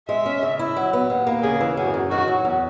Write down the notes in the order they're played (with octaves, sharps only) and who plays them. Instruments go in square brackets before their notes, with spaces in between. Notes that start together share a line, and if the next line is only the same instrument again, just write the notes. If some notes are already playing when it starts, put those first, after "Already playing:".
[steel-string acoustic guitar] G#3 [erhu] E5
[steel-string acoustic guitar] C#4
C#3
E4
F#3
B3
D#2
A#3
[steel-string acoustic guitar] C#3 [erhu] G#4
[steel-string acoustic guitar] E3
[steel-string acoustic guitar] F#2 [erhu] G#4
[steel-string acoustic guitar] F#2
[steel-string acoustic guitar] D#3 [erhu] F#4
[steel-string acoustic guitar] F#3
E2